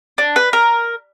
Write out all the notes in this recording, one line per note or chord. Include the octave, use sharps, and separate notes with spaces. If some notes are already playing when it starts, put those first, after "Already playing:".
D4
B4
A#4